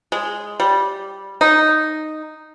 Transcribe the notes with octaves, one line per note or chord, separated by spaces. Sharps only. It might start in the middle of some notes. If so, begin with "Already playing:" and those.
G#3
G3
D#4